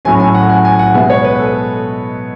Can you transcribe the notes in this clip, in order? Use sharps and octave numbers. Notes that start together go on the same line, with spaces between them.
A2 F#3 A3 C#4 G#5
G#5
F#5
G#5
G#5
F#5
B2 G#3 B3 E5
C#5
B4
A4